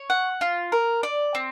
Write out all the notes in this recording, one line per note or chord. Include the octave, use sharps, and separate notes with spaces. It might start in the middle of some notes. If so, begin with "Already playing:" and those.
Already playing: C#5
F#5
F4
A#4
D5
C4